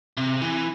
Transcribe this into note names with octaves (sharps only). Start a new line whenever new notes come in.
C3
E3